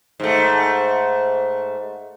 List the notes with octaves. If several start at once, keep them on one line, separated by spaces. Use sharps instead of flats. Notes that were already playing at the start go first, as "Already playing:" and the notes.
G#2 A3